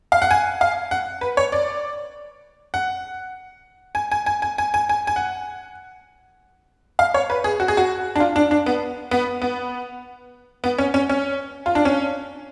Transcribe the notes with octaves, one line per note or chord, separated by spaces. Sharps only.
F5
F#5
G#5
F5
F#5
B4
C#5
D5
F#5
G#5
G#5
G#5
G#5
G#5
G#5
G#5
G#5
F#5
F5
C#5
B4
G#4
F#4
G#4
F#4
D4
F4
D4
D4
B3
B3
B3
B3
C#4
C#4
C#4
F4
D4
C#4